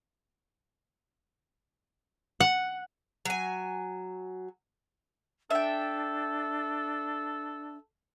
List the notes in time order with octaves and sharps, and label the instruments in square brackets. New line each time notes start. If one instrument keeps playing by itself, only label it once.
[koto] F#5
[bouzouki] F#3 G#5
[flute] D4 [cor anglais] A4 [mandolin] E5 G5